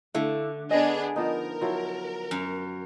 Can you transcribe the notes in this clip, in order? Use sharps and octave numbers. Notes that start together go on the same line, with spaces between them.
D3 A3 E4 F5
B3 D4 G#4 D#5
F3 B3 D#4 A#4
F3 F#3 E4
F#2